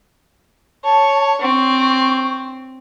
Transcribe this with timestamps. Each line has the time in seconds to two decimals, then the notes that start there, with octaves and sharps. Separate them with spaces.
0.84 C#5 A5
1.42 C4 C#6